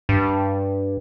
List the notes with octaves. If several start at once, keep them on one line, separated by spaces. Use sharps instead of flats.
G2